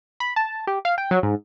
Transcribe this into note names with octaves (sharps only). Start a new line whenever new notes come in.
B5
A5
G4
F5
G5
F#3
G#2